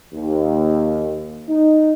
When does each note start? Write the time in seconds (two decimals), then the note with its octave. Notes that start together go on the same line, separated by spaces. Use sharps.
0.14 D#2
1.49 D#4